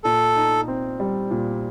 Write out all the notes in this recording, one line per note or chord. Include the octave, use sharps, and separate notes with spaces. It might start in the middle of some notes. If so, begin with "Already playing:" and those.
A#2 A4
D#4
C4
G3
A#2